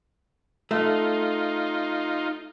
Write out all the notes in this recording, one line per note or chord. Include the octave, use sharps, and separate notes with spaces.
A3 D#4 F4